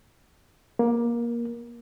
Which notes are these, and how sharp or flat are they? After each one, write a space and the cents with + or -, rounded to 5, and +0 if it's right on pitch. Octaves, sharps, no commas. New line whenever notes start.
A#3 +20